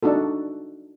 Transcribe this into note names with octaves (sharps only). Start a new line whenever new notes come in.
D4 D#4 F#4 A4